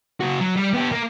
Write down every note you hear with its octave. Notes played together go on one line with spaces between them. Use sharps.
C#3 F#4
F#3
G3
B3 G4
A#3